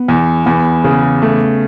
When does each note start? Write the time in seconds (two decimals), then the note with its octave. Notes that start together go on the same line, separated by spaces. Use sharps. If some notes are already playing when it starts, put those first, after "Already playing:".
Already playing: B3
0.08 E2
0.46 E2 B3
0.84 C#3
1.22 A3